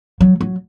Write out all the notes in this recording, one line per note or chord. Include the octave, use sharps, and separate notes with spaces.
F#3
F#3